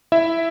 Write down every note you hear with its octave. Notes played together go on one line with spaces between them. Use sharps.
E4 E5